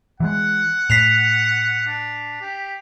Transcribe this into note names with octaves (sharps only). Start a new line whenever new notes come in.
E3 F#3 G#3 F#5
A2 B6 C7 F7
D4
G4